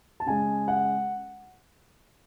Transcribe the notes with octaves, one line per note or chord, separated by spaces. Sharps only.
A5
C#3 G#3 G#5
F#5